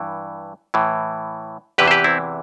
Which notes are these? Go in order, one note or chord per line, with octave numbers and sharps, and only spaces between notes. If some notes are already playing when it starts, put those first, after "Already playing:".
Already playing: G2 E3
A2 E3
E2 C3 E3 G4 B4
C5
G4 B4
C4 E4